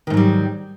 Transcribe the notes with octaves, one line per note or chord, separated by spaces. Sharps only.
G#2 D#3 F#3 G3